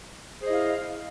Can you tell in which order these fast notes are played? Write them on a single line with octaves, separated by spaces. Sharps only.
G#4 C5 D#5 E4 F5